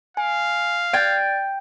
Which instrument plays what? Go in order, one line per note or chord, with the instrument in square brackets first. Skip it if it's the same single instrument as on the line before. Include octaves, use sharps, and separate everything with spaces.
[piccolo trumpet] F5 [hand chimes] G#5
[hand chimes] D5 G#6 A6 [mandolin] G5